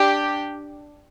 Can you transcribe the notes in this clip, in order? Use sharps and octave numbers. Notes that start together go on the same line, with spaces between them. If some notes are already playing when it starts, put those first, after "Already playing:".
Already playing: D4 G4